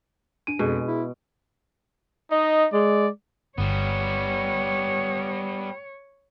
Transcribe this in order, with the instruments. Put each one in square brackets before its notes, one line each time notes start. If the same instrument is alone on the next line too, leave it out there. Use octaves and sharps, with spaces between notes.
[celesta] D4 D#7 [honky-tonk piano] D7
[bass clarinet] F2 [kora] B2 [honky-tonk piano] G#3
[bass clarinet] E4
[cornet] D#4 [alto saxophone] D#5
[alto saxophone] G#3 [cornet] D5
[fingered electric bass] G1 [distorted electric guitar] G3 B3 [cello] C#5